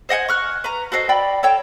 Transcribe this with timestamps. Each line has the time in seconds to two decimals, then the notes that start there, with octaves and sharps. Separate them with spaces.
0.09 C5 D#5 F#5 G#5
0.28 C#6 F6 F#6
0.64 B4 A#5
0.92 F#4 A4 C5 D#5
1.09 D5 G5 B5
1.43 A4 C#5 G5